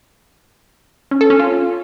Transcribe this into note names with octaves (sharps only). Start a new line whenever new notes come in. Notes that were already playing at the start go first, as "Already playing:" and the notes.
C#4
A4
C#4
F4